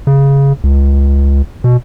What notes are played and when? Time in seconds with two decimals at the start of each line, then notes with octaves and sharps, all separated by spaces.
0.07 C#3
0.64 C#2
1.64 B2